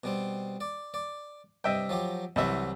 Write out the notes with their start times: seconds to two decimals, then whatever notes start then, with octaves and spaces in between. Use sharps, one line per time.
0.04 B2 G3 C4
0.61 D5
0.94 D5
1.64 G2 C3 D#5 E5 G5
1.89 F3 F#3 G4
2.36 C2 C3 E3 F#3 E5